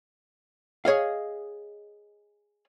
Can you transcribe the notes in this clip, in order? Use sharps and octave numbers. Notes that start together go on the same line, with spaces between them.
G#4 C#5 D#5 F5